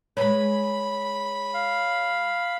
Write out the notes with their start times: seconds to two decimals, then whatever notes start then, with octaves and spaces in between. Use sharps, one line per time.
0.17 G#3 B4 C#5 B5
1.54 F5